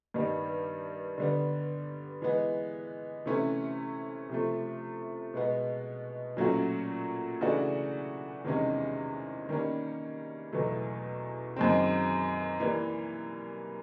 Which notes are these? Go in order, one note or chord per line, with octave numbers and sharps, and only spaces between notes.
G2 D#3 G3 B3
D3 G3 B3
E3 G#3 B3
C3 E3 A3 C#4 E4
C3 F3 A3
B2 G#3 B3
A#2 F#3 A3 C#4 F#4
C#3 E3 A3 D4 F#4
E2 C3 D#3 G#3 C#4
D#3 G3 A#3 C#4
E2 B2 F#3 A3
F#2 D#3 G#3 C4
E3 G3 A#3